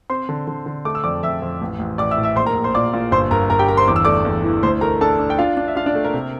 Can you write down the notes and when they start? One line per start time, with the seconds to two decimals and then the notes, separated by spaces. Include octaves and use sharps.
0.10 C4 C5 C6
0.29 D3
0.47 D3
0.66 D3
0.85 A3 D6
0.95 E6
1.04 F2 D5 D6
1.23 F2 E5 E6
1.42 F2
1.62 A1
1.79 A1
1.98 A1 D5 D6
2.11 E5 E6
2.17 A2
2.23 E5 E6
2.36 A#1 C5 C6
2.46 A#4 A#5
2.55 A#1
2.64 C5 C6
2.75 A#2 D5 D6
2.93 A#2
3.11 G1 C5 C6
3.31 G1 A#4 A#5
3.50 G1 A#4 A#5
3.59 G4 G5
3.68 G1 A#4 A#5
3.77 C5 C6
3.87 E2 D6
3.96 E6
4.05 A3 D5 D6
4.25 E2
4.44 E3
4.63 D2 C5 C6
4.81 A3 A#4 A#5
5.01 D4 A4 A5
5.19 D4
5.30 G5
5.38 D4 F4 F5
5.57 D4
5.68 E5
5.76 D4 F4 F5
5.86 D4 D5
5.95 A3
6.04 A#3 A#4
6.14 C3